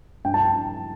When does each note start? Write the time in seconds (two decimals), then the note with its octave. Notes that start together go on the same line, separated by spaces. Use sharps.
0.25 G2 G5
0.34 A5